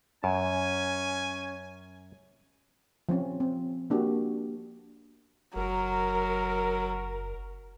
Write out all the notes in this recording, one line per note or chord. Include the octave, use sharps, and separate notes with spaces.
F#2 C#4 G#5
F3 C4 C#4
C4
A#3 D4 F#4 G4
F#1 F#3 A#4